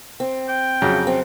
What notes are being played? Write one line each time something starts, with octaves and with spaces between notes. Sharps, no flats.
C4
G5
F2 C#3 F#3
C4